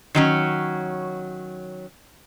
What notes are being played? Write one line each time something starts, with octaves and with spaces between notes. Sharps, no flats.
D#3 F#3 C#4